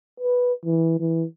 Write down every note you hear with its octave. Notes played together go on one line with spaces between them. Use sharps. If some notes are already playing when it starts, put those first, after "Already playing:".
B4
E3
E3